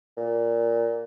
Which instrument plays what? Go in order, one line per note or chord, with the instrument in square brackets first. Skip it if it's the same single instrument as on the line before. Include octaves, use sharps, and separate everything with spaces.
[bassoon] A#2